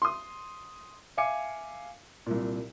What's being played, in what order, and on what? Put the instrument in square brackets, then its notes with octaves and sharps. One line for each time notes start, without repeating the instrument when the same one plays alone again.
[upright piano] C6 D#6
E5 F5 G#5 D6 C#7
C2 A#2